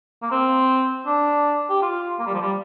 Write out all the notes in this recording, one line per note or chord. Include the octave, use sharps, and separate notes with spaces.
A#3
C4
D4
G4
F4
A#3
G3
F3
G3